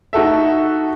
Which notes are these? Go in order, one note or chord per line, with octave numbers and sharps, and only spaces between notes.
D#4 F#4 A4 E5